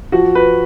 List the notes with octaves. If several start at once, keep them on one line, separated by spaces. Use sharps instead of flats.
F3 F#4
B4